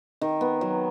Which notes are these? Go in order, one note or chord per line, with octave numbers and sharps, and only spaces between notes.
D#3
B3
F#3